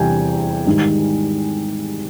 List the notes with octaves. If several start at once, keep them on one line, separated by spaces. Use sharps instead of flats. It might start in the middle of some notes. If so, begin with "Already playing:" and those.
Already playing: E2 C3 E3 G3 G5 G#5
G#2 D#3 G3